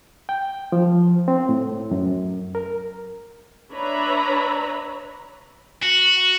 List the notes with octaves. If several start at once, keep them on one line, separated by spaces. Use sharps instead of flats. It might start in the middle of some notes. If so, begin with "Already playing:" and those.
G5
F3
C4
A2
F#2
A#4
D4 B4 C#5 E5 A#5 B5
F#4